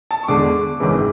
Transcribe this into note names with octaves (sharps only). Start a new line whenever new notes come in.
A5
C#6
E2 D3 G#3 D6
G#1 F#2 C#3 E3 G#3